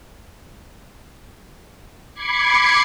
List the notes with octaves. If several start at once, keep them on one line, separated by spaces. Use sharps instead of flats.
B5 D6 G#6 C7 C#7